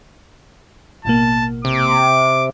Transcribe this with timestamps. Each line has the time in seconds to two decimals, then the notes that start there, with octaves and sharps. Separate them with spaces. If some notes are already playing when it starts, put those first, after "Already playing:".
1.05 A1 B2 A#3 A5
1.65 C3 D6